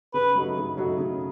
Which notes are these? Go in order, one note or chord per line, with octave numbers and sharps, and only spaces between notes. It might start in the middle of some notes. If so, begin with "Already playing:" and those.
C#3 B4
F#3 A3 D#4 F#4
C#3
F#3 A3 D#4 F#4
C#3